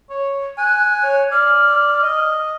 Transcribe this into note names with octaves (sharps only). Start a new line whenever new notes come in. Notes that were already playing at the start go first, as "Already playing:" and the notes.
C#5
G#5 F#6
C#5
D5 F6
D#5